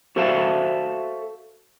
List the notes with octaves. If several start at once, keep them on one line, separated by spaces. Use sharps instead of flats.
F#4 A4 C5 E5 F5 A5